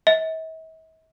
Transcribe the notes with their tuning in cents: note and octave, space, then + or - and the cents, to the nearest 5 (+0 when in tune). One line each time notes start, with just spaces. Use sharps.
E5 -45